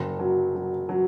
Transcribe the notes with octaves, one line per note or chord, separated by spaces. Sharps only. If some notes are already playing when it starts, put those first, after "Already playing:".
Already playing: F#1
F#3
F#3
F#3